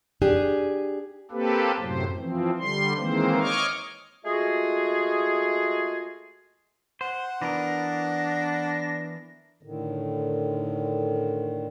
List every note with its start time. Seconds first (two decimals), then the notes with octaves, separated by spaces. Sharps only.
0.22 D4 G4 G#4 G#5
1.31 A#3 C4 G4 A4 B4
1.80 F#2 A2 C3 F#3 C5
2.17 E3 F3 C4
2.59 D3 G3 C6
2.97 D#3 E3 G#3 A#3 C4 C5
3.41 C#5 D#5 C#6 D6 F6
4.24 G#3 A3 F4 F#4 G#4
7.01 C5 F#5
7.41 E3 B3 D4 A#4 A#6
9.63 A2 D3 D#3